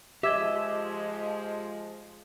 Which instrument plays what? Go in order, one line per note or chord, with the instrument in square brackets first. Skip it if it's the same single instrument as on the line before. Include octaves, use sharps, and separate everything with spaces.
[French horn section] F3 G#3 [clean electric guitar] G4 D#5 [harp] E5 [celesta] D6 G#6 B6